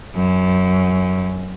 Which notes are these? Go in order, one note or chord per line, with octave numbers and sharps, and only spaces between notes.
F#2